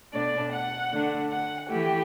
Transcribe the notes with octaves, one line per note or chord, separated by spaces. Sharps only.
B2 A3 D4 D5
F#5
D3 A3 D4
F#5
E3 A3 E4 G4